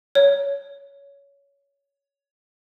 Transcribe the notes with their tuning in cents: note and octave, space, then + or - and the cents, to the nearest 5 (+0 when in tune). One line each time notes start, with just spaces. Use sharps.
C#5 +15